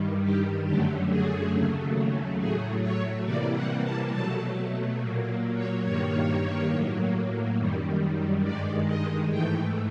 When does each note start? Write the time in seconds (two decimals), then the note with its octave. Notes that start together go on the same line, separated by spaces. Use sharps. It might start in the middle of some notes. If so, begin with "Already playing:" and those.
Already playing: G2 D#3 G3
0.23 G4
0.66 F#2 D3 F#3 A3 G4
1.10 G#4
1.53 D#2 C#3 F#3 A3
2.39 A2 F#3 A3 G#4
2.82 C#5
3.25 C3 E3 G3 A#3 D5
3.54 F#5
3.82 A5
4.11 B2 F#3 A3 A5
4.98 A#2 F#3 A#3
5.55 C#5
5.84 G2 D#3 G3 A#3 C#5
6.70 A2 F#3 A#3
7.58 F#2 D#3 G3
8.43 G2 D#3 G#3 D5
8.86 D#5
9.30 G#2 E3 A3 G5